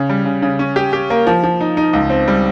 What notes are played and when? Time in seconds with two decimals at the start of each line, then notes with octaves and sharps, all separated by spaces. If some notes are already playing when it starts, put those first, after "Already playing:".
Already playing: C#3
0.09 G3
0.25 C#3
0.42 C#3
0.59 C#4
0.76 G4
0.93 G4
1.10 A#3
1.27 F3
1.44 F3
1.61 D#4
1.77 D#4
1.93 C#2
2.10 C4
2.28 G3